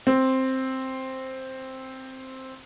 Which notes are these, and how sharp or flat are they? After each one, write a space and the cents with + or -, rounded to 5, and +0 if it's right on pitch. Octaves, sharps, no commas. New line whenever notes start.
C4 +5